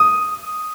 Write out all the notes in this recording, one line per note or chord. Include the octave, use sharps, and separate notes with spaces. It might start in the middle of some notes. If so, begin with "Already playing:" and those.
Already playing: D#6